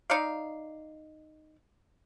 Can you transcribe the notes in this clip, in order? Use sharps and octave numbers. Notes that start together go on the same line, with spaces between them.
D#4 D5 F5